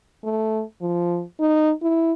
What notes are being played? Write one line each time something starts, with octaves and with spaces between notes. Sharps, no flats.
A3
F3
D#4
E4